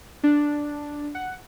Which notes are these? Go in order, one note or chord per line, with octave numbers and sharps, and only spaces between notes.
D4
F#5